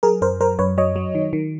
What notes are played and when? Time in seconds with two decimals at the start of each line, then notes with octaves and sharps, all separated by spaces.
0.03 F#3 G#4 A#4
0.22 F#2 A#4 C5
0.40 F#3 A#4 C5
0.59 F#2 B4 C#5
0.78 F#3 C#5 D#5
0.96 F#3
1.15 D#3
1.33 D#3